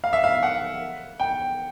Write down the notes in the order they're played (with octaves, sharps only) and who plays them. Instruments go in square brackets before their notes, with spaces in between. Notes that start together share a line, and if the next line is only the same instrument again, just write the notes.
[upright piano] F5
E5
F5
F#5
G5